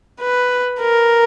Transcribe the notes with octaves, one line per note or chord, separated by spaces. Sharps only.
B4
A#4